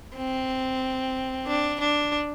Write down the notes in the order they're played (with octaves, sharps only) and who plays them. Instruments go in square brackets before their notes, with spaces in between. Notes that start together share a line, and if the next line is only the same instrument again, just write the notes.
[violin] C4
D4
D4